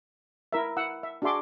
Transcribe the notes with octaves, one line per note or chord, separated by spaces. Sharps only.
E4 A#4 E5
E4 F#5 E6
E5
D4 F#4 G#4 E5 C6 D6